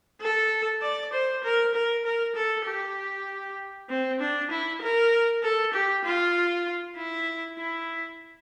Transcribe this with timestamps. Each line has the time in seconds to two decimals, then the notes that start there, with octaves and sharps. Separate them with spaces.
0.21 A4
0.82 D5
1.13 C5
1.44 A#4
1.74 A#4
2.05 A#4
2.35 A4
2.66 G4
3.89 C4
4.20 D4
4.51 E4
4.82 A#4
5.43 A4
5.74 G4
6.04 F4
6.97 E4
7.58 E4